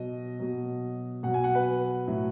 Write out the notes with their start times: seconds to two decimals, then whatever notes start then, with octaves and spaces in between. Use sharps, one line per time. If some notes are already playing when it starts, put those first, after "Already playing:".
Already playing: B2 F#3 D#5
0.39 B2 F#3
1.23 B2 F#3 F#5
1.34 G#5
1.44 F#5
1.55 B4
2.08 A2 F#3